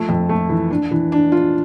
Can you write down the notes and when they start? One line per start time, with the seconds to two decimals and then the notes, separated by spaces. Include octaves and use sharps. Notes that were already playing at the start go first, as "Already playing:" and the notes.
Already playing: F3 A3
0.09 F2
0.29 A3
0.49 E3
0.70 D4
0.91 E3
1.12 D4
1.32 F4